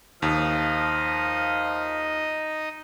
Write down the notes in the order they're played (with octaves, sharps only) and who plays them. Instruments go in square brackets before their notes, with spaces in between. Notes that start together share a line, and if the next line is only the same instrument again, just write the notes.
[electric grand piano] D#2 [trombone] F3 [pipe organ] D#4 D#5 [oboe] F5